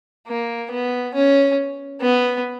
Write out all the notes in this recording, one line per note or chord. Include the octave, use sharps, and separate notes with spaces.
A#3
B3
C#4
B3